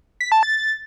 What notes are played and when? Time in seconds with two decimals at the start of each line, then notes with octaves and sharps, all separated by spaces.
0.21 B6
0.32 A5
0.43 A6